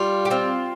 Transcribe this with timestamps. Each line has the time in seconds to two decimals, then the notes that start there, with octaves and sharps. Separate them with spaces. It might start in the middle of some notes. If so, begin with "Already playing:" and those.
Already playing: G3 F4
0.25 G4
0.30 C4 F4